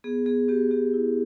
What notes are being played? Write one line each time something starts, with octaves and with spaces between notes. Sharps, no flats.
B3 G#4
B3 G#4
B3 G4
B3 G4
E4